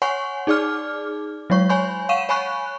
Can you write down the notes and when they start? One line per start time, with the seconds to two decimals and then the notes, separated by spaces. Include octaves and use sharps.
0.02 C#5 F#5 G#5 C6 C#6
0.47 D#4 G#4 D5 D6 F6
1.50 F#3 G#3 C#5 C#6
1.69 C#5 G#5 B5 C6 G6
2.09 F5 F#5 C#6 D#7 E7
2.29 C#5 G#5 B5 C#6 F#6